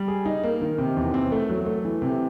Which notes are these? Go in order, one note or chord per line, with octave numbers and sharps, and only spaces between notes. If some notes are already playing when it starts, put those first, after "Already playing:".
Already playing: G3
G#4
D#4
A#3
D#3
C3
E2
C4
A3
F#3
A3
E3
C3